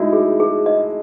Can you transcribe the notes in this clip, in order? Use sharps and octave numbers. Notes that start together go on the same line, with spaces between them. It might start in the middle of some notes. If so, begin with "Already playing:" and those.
Already playing: G#3 A3 D#4 E4 F#4
G#4
G#4
D#5